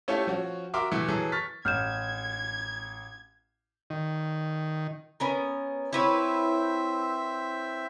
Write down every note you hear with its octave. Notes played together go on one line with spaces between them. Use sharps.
A3 C#4 E4 F4 G4 A4
F3 C#4 F#4
F#4 A#4 E5 C6 D6 F6
C3 E3 A3
E3 F#3 G#4 A4
C#6 F6 A6 B6
A1 F6 G6 G#6 E7
D#3
B3 C#4 A#4
C4 E4 B4 C#5 E5